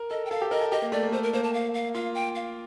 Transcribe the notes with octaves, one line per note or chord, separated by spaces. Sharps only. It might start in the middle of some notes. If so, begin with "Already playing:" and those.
Already playing: A#4
A4 D#5
G5
A4 F5
G4
A#4 D#5
A4
G4 D#5
A#3
A3 D5
A#3
A3 C5
A#4
A#3 C5
A5
F5
F5
F4 F5
G5
F5